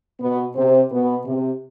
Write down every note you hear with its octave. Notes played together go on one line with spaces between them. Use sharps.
B2 B3
C3 C4
B2 B3
C3